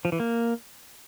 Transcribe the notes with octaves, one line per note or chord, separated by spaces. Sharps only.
F3
E3
A#3